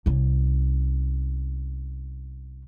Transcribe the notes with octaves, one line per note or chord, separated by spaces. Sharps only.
C2 C#4